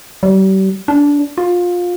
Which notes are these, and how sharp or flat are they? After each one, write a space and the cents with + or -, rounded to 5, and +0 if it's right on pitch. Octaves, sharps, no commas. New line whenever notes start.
G3 -40
D4 -20
F4 +20